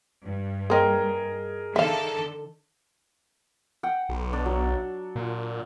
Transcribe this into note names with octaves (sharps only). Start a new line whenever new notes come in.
G2
A#3 C4 G#4 A#4 D#5
D3 D#3 A4 E5 F5
F#5 G5
B1
D4
F#3
A#2